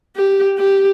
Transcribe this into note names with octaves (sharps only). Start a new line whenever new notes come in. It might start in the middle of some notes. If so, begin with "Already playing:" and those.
G4
G4